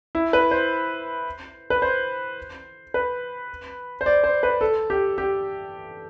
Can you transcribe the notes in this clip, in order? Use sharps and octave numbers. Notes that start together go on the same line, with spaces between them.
E4
B4
C5
B4
C5
B4
C5
D5
C5
B4
A4
G4
G4